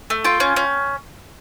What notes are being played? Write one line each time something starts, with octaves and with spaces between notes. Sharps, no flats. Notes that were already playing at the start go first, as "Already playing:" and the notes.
A3
F4 G5
C#4
C#4